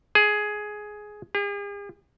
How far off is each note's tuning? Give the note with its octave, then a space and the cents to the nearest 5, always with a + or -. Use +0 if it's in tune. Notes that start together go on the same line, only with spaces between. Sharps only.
G#4 +10
G#4 -45